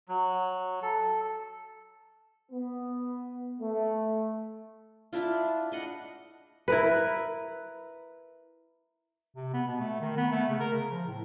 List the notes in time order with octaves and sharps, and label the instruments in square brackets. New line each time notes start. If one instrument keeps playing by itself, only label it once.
[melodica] F#3
A4
[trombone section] B3
A3
[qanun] D4 E4 F4
D4 D#5 F#5
[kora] E4 A#4 B4
[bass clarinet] C3
B3
B2
A3
D#3
B3
A3
C#3
A#4
C#3
F3
A2